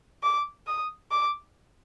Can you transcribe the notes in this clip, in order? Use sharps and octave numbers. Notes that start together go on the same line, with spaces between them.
D6
D#6
D6